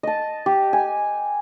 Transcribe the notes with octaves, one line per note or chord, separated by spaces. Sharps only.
D#5 A5
G4
G#5